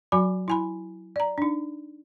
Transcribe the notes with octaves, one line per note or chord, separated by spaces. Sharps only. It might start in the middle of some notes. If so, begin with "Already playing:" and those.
F#3 F#4 G#5 B5
E4 G#5 B5
D5 A#5
D4 D#4